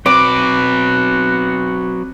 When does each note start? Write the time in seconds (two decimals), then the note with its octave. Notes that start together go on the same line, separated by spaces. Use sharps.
0.06 F#3 C4 F#4 B4 C5 D6